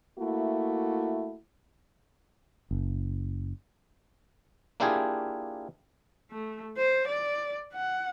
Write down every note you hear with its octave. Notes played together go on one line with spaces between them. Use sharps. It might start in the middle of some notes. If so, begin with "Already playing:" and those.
A3 A#3 E4 F#4
F#1
A#3 D4 E4 F4 G4 G#4
A3
C5
D5
F#5